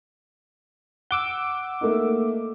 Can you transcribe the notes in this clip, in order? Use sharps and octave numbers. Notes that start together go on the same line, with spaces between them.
F#5 D6 E6 G7
A3 A#3 D#4